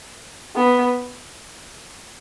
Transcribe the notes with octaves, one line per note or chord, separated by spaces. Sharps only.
B3